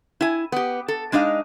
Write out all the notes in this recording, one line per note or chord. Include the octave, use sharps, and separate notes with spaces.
E4 G#5
B3 G4
A4
G#3 D4 D#4 D#5 F5